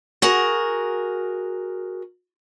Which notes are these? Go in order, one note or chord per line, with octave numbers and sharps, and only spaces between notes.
F#4 G#4 A#4